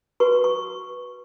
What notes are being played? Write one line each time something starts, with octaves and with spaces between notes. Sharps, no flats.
F#4 B4 C#6
C#6